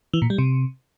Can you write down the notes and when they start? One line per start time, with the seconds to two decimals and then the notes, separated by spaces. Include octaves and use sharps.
0.13 E3
0.22 A#2
0.30 G3
0.38 C3